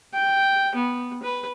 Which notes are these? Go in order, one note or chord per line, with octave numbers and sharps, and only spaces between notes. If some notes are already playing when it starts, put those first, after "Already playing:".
G5
B3
B4